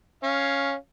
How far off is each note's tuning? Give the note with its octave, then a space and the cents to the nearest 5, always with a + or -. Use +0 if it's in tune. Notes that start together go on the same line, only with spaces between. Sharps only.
C#4 +0 F5 +0